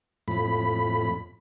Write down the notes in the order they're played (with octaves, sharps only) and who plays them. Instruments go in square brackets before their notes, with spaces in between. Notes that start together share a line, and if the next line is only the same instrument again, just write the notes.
[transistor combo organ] F2 A2 B5